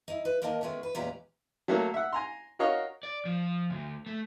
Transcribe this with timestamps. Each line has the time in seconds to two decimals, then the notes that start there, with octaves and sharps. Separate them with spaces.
0.08 D#4 E4
0.25 B4
0.42 D#2 A#3 A#4 D#5 F5 A5
0.61 D#3 G#3 A3 B3 C#4
0.83 B4
0.95 E2 A#2 G#3 C#4 G4 A#5
1.68 F#3 A3 A#3
1.94 E5 F#5
2.13 G#5 A#5 C6
2.59 F#4 A#4 C#5 D#5 F5 C#6
3.03 D5
3.25 F3
3.70 D2
4.06 A3